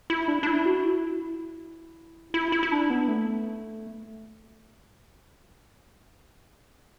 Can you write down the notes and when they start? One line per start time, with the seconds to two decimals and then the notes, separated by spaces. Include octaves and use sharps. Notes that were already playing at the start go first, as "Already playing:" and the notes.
0.10 E4
0.28 D4
0.43 D4
0.47 E4
0.66 F#4
0.85 E4
2.34 E4
2.52 E4
2.63 E4
2.72 D4
2.90 B3
3.08 A3